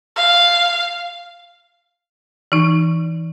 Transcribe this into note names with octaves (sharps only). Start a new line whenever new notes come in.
F5
E3 D#4